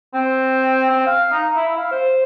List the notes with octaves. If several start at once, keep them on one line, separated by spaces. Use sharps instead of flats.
C4
C4
F5
D#4
E4
F5
C5